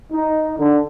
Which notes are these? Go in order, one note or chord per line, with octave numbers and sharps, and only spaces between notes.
D#4
D3